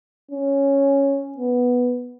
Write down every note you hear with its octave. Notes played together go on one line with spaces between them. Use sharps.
C#4
B3